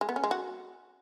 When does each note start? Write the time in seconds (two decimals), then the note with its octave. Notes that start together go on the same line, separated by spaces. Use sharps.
0.01 G#3
0.09 B3
0.16 C#4
0.24 G#3
0.31 F#4